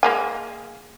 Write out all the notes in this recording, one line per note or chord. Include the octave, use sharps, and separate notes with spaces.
G#3 A#3 G#5